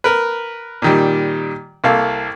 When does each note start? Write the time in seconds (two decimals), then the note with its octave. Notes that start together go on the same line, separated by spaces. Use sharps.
0.04 A#4 B4
0.82 A#2 D#3 G3
1.84 C2 A#3 A4 F5